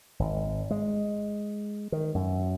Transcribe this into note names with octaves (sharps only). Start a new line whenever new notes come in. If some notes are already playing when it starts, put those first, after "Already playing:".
G#1
G#3
D#3
F#2